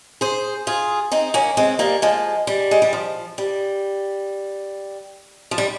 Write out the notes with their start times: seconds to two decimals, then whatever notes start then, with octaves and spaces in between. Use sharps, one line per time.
0.21 G#4 C5
0.67 F4 G#4
1.12 C4 D#4
1.34 A#3 C#4
1.57 G#3 C4
1.79 G3 A#3
2.02 F3 G#3
2.47 G3
2.71 G#3
2.82 G3
2.93 F3
3.38 G3
5.51 F3
5.58 G3